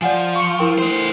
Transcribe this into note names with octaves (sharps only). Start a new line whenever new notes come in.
F3 D5 F#5 G#5
C#6 C#7
E4 A#4 G5
A3 C5